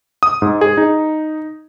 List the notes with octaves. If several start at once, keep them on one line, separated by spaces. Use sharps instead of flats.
D#6
G#2
G#4
D#4